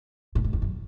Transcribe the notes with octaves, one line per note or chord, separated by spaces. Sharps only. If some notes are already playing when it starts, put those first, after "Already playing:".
A2
G#2
E2
F#2